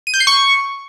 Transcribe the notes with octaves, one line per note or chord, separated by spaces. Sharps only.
D#7
G6
C7
C#6